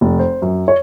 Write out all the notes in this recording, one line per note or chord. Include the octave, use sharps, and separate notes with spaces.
F1
C5
F#2
C#5